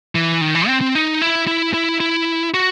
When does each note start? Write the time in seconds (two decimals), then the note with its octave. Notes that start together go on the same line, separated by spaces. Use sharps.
0.15 E3
0.41 D#3
0.55 E3
0.67 C4
0.81 C4
0.95 D#4
1.22 E4
1.47 E4
1.74 E4
2.00 E4
2.54 F#4